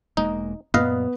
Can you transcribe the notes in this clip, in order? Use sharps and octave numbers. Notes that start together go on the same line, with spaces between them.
E1 G#3 A#3 D#4
F#2 A#2 B3 B4 D#5 F5